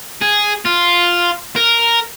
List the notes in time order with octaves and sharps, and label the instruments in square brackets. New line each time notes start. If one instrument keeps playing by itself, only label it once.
[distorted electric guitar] G#4
F4
A#4